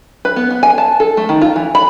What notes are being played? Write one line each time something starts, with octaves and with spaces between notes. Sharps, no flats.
B4
B3
B3
G#5
A5
A4
A3
D#3
F4
E3
B5